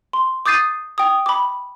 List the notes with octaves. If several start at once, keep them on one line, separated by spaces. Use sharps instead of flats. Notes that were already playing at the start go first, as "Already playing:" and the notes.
C6
D6 D#6 G6 A6 C7 D#7
G5 D#6
B5 D6